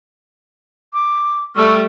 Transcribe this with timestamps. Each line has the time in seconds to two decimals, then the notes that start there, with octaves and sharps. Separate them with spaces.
0.93 D6
1.55 G3 A3 C#6 E6 F6